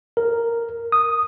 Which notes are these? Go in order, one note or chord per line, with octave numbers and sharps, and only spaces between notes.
A#4
D#6